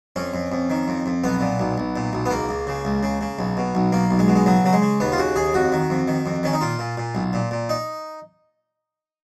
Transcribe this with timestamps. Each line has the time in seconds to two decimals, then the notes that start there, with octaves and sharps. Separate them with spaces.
0.16 F2 C#4
0.34 F2
0.52 F2
0.70 D#3
0.88 F2
1.06 F2
1.24 B1 B3
1.41 A#2
1.59 B1
1.78 B1
1.96 A#2
2.13 B1
2.26 B3
2.31 C#2 A#3
2.49 C#2
2.67 C#3
2.85 C#2
3.03 C#3
3.21 C#3
3.39 B1
3.57 B2
3.75 B1
3.92 B1 A#3
4.11 B1
4.19 G#3
4.28 B2
4.36 G#3
4.46 C#3 F#3
4.64 C#3 F#3
4.73 G#3
4.82 C#3
5.00 D#2 B3
5.12 F4
5.18 C#3 F#4
5.36 D#2 G#4
5.54 F2 F#4
5.72 D#3
5.90 F2
6.08 D#3
6.26 F2
6.43 D#3 C#4
6.54 D#4
6.61 A#2 F4
6.79 A#2
6.98 A#2
7.15 B1
7.33 A#2
7.51 A#2
7.69 D#4